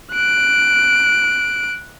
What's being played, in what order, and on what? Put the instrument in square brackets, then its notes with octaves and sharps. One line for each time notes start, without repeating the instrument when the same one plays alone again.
[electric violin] F#6 D7